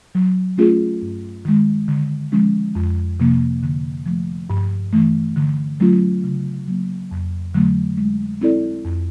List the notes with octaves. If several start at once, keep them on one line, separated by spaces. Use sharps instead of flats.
F#3
A3 C#4 F4 G#4
G2
D#3 G#3
D3
F3 G#3 C#4
F2
C3 F3 A#3
D3
F3 A3
G2
E3 A3
D3
F#3 A3 C#4 F4
C#3
F#3 A#3
F2
D3 F#3 A3
G#3
C4 E4 A4 D5
F2